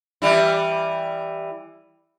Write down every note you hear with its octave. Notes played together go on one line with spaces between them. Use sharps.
E3 G3 E4